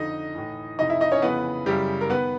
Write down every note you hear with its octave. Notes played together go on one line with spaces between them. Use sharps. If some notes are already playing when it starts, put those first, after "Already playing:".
Already playing: F2 D3 D#4 D#5
A2 E3
F2 C3 E3 D#4 D#5
E4 E5
D#4 D#5
C#4 C#5
F2 C#3 E3 B3 B4
F#2 C#3 E3 G3 G4
A#4
D#3 B3 B4